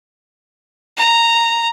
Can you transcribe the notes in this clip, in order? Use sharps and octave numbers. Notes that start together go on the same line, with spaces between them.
A#5